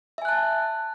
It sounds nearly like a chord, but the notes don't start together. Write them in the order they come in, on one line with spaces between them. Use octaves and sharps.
E5 G#5 F#6 A5